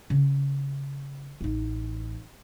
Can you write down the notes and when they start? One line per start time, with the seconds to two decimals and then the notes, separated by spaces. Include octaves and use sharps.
0.10 C#3
1.41 A1 D#4